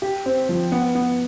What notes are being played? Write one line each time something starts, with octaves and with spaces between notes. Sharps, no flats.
G4
C4
F3
B3
B3